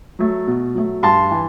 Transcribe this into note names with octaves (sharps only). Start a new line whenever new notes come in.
F#3 A3
B2
F#3 A3
G2 A5 C6
E3